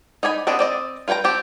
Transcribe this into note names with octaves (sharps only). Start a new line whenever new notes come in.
D#4 D5 G#5 B5
B3 C4 D4 D#5
C4 D5 D#5
F4 B4 F#5 G5 A#5
C4 G4 A5